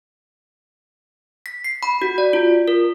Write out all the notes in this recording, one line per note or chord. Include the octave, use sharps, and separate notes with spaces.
B6
C7
B5
F#4
D5
F4
A#4